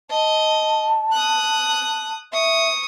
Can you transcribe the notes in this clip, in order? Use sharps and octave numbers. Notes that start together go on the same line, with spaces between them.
D#5 A5
D#6 F#6
E5 C#6 D#6